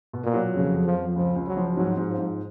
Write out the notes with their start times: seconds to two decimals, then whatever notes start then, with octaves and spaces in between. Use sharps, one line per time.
0.13 B2
0.24 A#2
0.34 F#3
0.54 F2 C#3
0.74 F2
0.85 F3
0.95 F2
1.16 C#2 F3
1.36 C#2
1.47 F#3
1.57 F3
1.76 G#2 F#3
1.97 G#2
2.08 F3
2.18 G#2